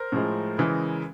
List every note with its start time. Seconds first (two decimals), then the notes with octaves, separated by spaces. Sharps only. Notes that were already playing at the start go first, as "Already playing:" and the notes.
Already playing: A#4 C5
0.12 A2 F3 G#3
0.58 C#3 E3 G#3